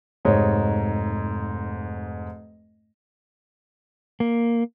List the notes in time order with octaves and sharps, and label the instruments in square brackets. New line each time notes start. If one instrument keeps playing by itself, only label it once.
[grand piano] F1 G#2 C#5 D#5
[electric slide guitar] A#3